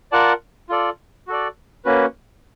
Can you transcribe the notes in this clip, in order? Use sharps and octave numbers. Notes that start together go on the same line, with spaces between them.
F4 A#4 D5 F#5 A5
F4 A4 D5
F#4 A4 D5
A#3 C#4 F#4 B4